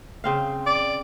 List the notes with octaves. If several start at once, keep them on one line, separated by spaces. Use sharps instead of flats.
C#3 C4 F5
D5